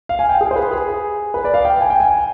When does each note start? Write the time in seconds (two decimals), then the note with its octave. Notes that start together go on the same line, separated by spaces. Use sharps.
0.09 F5
0.19 G#5
0.29 G5
0.41 G#4
0.51 C5
0.56 B4
0.71 G#4
1.34 B4
1.45 D5
1.54 F5
1.65 G5
1.81 G#5
1.90 G5
2.00 G#5